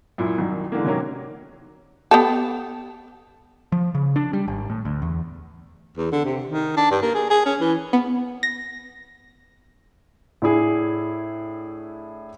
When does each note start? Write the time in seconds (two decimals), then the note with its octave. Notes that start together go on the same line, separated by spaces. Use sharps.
0.18 F#2 A#2 E4
0.38 C2 F#2 D#3
0.72 G#2 D3 E3 A#3
0.85 C3 D#3 F#3 A#3 C#4 A#4
2.11 B3 G4 A4
3.72 F3
3.95 C#3
4.16 D4
4.33 G3
4.48 G#1
4.70 A2
4.85 D2
5.02 E2
5.97 E2
6.12 D3
6.25 C3
6.46 D#3
6.76 D4
6.91 G2
7.02 A#3
7.14 G#4
7.30 G#4
7.46 C#4
7.61 E3
7.93 B3
8.43 A#6
10.42 A2 D4 E4 G#4